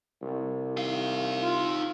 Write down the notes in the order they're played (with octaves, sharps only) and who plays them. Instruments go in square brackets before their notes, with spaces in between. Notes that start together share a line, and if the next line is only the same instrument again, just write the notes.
[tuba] C2
[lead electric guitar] D#4 F5
[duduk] F4